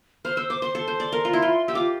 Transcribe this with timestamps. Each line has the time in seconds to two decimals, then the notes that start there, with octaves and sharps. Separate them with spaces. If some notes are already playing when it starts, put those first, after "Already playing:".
0.25 C5 F6
0.37 C5 E6
0.50 C5 D6
0.62 C5 C6
0.75 A4
0.88 C5
1.00 D5
1.12 A#4
1.25 F4
1.33 E4
1.42 F4
1.68 G4 E6
1.75 F4 D6